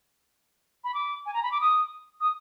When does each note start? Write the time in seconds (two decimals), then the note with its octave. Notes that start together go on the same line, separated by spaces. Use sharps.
0.84 B5
0.94 D6
1.26 G#5
1.34 A#5
1.43 B5
1.52 D6
1.61 D#6
2.21 D#6